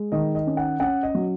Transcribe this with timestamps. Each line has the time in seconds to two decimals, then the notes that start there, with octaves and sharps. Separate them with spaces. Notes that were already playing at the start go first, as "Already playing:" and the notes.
Already playing: G#3
0.12 D#3 D#5
0.35 D#5
0.47 C#4
0.57 F#5
0.80 C#4 F#5
1.03 D#5
1.15 F#3